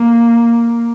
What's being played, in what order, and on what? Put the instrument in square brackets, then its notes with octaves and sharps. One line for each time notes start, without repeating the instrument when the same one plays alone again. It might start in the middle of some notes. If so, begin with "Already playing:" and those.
Already playing: [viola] A#3